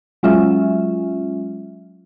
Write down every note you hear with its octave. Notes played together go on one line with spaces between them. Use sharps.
F#3 G#3 C#4 F4 E5